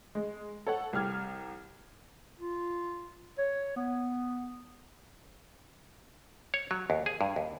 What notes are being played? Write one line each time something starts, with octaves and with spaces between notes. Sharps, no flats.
G#3
A4 C#5 F#5
C2 G4 F6 G#6
F4
C#5
B3
C#5
F#3
D#2
G#4
G2
D#2